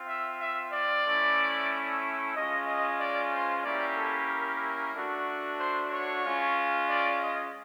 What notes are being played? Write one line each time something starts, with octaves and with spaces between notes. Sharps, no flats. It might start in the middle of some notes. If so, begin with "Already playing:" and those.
Already playing: C4 F4
E5
E5
D5
A3 C#4 E4
G#3 C#4 F4 D#5
D#5
D5
C5
A#3 C#4 E4 G4 D5
A4
A#4
A3 D4 F#4
C5
C#5
G#3 C#4 F4
D5
D#5